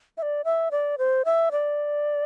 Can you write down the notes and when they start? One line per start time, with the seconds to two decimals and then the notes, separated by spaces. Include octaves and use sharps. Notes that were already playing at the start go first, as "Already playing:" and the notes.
0.17 E5
0.22 D5
0.45 E5
0.71 D5
0.98 C5
1.25 E5
1.52 D5